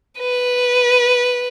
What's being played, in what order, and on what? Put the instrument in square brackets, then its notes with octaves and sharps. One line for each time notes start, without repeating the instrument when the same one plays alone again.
[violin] B4